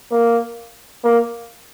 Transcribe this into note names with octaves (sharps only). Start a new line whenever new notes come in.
A#3
A#3